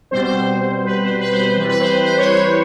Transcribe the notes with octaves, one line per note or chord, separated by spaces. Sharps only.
B2 G3 C4 C5
C5
C5
B4
C5
B4
C5
C5
E3 G3 C4 B4
B4
C5
C5
C#5
C#5